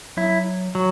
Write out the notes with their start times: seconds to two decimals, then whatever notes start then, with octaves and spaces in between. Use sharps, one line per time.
0.17 F#3 E4
0.75 F#3